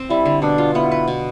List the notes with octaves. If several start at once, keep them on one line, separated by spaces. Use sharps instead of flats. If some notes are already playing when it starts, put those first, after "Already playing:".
Already playing: C4
G3 E4
D3
B2 D4
F4
B3 E4
B4
B2